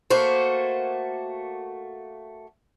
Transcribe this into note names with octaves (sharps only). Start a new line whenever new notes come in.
A3 A#3 F#4 C5